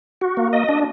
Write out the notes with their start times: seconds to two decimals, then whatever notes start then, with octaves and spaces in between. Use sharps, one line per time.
0.21 F#4
0.37 A#3
0.53 D#5
0.69 D4